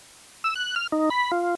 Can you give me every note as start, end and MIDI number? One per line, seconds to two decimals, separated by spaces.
0.44 0.54 88
0.56 0.75 90
0.76 0.87 89
0.92 1.09 63
1.10 1.32 83
1.32 1.55 65